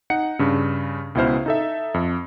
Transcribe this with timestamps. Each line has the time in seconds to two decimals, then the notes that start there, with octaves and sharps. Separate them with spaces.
0.10 D#4 F#5 C#7
0.39 G2 C#3
1.15 C#2 B2 E4 C5 F6
1.46 D#4 A4 E5
1.94 F2